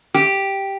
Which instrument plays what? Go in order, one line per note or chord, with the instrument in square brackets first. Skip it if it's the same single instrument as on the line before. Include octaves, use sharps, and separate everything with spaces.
[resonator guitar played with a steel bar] G4